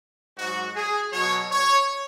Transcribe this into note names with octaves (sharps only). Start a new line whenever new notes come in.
G#2 F#3 F#4
G#4
B2 F#3 C#5
C#5